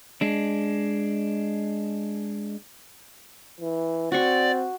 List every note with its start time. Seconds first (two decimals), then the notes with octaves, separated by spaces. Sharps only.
0.21 G#3 D4
3.61 E3
4.12 C4 F#4 D5 C#6